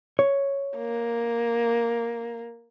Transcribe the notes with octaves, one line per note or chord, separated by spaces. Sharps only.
C#5
A#3